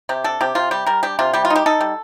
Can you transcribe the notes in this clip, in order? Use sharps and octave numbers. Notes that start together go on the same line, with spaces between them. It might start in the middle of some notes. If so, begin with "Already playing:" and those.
C3 G4
D4 A4
C3 G4
C3 F4
G3 G4
G3 A#4
D4 G4
C3 F4
G3 G4
F4
D#4
G4
D#4 A4
G3